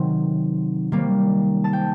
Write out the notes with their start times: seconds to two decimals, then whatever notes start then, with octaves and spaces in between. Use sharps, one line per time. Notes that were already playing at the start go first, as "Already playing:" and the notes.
Already playing: C3 D#3 F#3 C4
0.92 D#3 G3 A#3
1.64 A5
1.73 G5